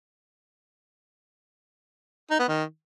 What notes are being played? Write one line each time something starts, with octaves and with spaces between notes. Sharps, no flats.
D#4
B3
D#3